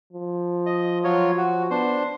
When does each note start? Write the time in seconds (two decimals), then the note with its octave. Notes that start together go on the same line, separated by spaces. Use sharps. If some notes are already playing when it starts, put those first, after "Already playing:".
0.13 F3
0.66 D#5
1.04 F#3 F4 C#5
1.37 F#4
1.71 B3 D4 C5